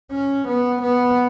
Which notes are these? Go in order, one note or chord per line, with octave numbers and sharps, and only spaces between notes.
C#4
B3
B3